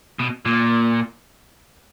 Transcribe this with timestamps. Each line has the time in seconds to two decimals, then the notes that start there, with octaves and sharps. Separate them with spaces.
0.19 B2
0.45 A#2